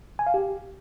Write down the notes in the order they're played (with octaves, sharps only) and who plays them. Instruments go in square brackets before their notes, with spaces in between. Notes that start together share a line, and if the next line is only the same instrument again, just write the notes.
[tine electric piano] G#5
F5
G4